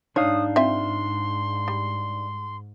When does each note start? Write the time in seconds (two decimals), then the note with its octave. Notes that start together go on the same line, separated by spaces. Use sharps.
0.16 G#2 D4 D#4 C#5 F5 D#6
0.56 C4 F4 E5 C6
1.68 G3